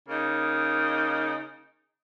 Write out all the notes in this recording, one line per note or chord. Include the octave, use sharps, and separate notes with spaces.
C#3 A#3 D#4